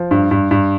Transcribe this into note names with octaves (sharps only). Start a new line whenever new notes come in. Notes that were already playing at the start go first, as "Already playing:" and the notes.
Already playing: F3
G2
G2
G2